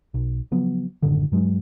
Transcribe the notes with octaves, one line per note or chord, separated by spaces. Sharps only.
B1
C#3 F3 F#3 B3
F#1 A2 D3 D#3
G2 F#3 G#3